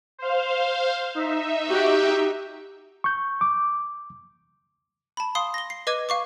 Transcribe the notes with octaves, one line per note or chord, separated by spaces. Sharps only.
C5 F5
D#4 E5
F#4 G4
C#6 G6
D6
A5 B5
F5 C6 D#6
A#6 G7
C7
B4 D#5 D6 G#6 D#7
F5 C#6 D6